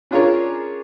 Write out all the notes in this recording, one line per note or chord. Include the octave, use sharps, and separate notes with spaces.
C#4 D4 F4 G#4 A#4 C#5